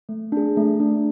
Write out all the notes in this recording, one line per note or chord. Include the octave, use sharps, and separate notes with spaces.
A3
D4 G#4
A3
D4 G#4